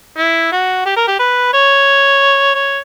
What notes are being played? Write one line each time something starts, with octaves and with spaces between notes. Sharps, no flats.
E4
F#4
G4
A#4
G4
B4
C#5
C#5